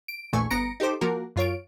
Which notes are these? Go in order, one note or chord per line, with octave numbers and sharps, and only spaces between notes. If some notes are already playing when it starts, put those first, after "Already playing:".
D7
A#1 E2 A#2 A3 G#5 C#6
G1 B3 A#5 A#6 C#7 D7
D#4 G4 A4 C5 D6
F3 A#3 F#4 A#4
F#2 F4 C#5 D7